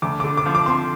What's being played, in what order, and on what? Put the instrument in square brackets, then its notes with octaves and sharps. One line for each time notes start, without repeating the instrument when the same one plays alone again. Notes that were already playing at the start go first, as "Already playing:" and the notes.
[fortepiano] D2 [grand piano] D6
[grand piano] D6
[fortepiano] D3
[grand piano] D6
[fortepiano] F3
[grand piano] D6
[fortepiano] C4 [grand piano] C6